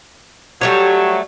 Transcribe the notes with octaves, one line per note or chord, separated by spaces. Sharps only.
F#3 G3 A3 C#5